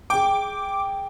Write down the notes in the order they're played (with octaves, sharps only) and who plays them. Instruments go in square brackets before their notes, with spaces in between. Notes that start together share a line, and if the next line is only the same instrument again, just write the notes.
[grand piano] G#4 G5 [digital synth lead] D6